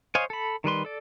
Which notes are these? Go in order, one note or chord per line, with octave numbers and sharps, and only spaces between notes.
C5 C#5 D#5 F5 G#5
A4 B5
D#3 G3 B4 C6
A4 D5